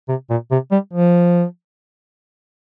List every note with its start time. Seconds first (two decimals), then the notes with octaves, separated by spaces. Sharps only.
0.09 C3
0.30 A#2
0.51 C3
0.71 G3
0.93 F3